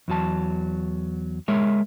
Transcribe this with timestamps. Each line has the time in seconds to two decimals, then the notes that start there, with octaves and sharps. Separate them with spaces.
0.08 E2 F#3 A5
1.48 G#3 A#4 C#5 E5